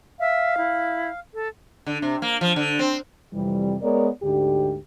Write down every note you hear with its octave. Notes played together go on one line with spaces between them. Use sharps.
E5 F5
E4
A4
D3
C3
A#3
F3
D3
C4
F2 C3 E3 G3
G#3 B3 A#4 C#5 D5
D2 G#2 D3 G4